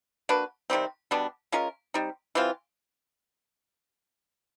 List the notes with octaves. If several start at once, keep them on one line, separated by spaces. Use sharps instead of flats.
A#3 D4 F#4 B4
C3 D#3 G3 C4
B2 G3 B3 D4
G#3 C#4 F4 A#4
G3 C4 D#4
E3 G3 C4 F4